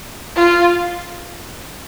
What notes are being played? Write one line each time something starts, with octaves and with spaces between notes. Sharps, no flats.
F4